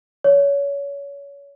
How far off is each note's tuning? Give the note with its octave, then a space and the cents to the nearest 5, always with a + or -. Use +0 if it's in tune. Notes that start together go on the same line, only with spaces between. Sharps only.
C#5 +25